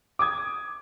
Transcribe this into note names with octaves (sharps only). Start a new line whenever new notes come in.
D6 D#6 G#6